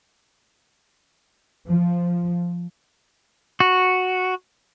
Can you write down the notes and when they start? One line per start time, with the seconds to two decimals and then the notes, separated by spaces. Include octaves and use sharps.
1.68 F3
3.60 F#4